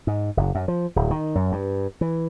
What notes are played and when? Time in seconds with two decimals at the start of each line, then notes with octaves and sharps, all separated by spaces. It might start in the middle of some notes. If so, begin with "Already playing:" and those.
0.07 G#2
0.37 F#1
0.55 F#2
0.68 F3
0.96 D1
1.11 D#3
1.35 F#2
1.52 G2
2.01 E3